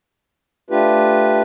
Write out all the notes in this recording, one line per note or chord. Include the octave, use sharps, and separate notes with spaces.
A3 D4 F4 G4 B4